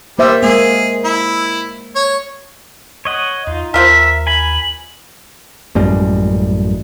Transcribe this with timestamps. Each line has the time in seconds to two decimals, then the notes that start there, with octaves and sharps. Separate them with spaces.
0.19 G3 A#3 C5 E5
0.43 G#3 A#3 G#4
1.05 E4
1.96 C#5
3.05 C#5 D#5 F#5
3.47 E2 D#4 F4
3.74 D#2 F3 F4 A#4 E5 B6
4.27 G#5 B5 F#7
5.75 A1 F#2 G3 G#3